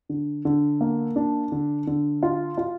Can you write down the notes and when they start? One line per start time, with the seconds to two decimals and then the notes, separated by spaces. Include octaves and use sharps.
0.09 D3
0.45 D3
0.81 A#3
1.16 D4
1.52 D3
1.87 D3
2.23 F4
2.58 F4